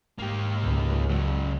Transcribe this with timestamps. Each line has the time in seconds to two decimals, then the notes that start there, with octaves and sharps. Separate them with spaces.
0.18 G#2 A#3 G4
0.63 C#2
1.09 C#3 F#3